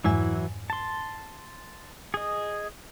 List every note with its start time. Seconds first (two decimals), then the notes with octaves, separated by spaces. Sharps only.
0.04 F2 G#2 E3 F#3 E4 G#5
0.70 A5 C6
2.14 G#4 D#5